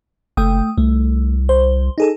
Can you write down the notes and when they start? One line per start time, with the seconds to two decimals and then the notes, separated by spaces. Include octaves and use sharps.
0.37 F#1 A3 G5 D#6
0.78 C2 A3
1.49 C5
1.98 D#4 G#4 A4